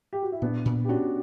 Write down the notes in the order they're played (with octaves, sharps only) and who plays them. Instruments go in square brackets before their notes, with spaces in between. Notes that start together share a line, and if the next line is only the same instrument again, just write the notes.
[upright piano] G4
F#4
E4
[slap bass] A#2 [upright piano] B3 D4
[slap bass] A#2
[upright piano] G4
[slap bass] C#4 [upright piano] D4 F#4